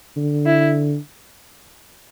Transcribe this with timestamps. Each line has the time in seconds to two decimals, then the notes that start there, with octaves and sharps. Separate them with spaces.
0.17 D3
0.46 E4